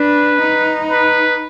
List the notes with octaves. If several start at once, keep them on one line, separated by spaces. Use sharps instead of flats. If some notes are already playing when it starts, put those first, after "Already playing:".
Already playing: D4 B4
D#4
B4